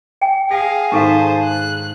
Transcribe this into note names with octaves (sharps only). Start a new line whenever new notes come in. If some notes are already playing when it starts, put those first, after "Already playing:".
G5 G#5
G#4 F5 A#6
G#2 D#3 G4 A4 C5 F5 A5
F#6